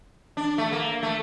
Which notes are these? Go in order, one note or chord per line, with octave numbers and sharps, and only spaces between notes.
D4
A3
A#3
A3